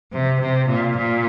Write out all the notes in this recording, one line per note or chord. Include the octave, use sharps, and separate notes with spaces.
C3
C3
A#2
A#2